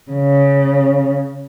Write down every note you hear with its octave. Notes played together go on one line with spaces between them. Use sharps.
C#3